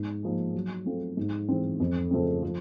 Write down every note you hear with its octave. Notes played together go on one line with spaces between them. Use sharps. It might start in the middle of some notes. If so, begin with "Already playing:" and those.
Already playing: G#2
F3 A#3 D#4 G#4
F#3
A3 C4 F4
G#2
E3 G#3 C4
F2
C#3 F3 A3 C4
F3